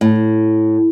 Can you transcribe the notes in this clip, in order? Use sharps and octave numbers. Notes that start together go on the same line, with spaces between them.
A2